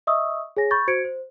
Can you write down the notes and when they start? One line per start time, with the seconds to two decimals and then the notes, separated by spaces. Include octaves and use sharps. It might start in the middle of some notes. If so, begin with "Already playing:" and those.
0.07 D#5 E5 C#6 D#6 E6
0.57 G#4 C#5 G#5 A#6
0.71 B5 C#6 G6 A6
0.88 F#4 C5 G#6 C#7 D7
1.05 C5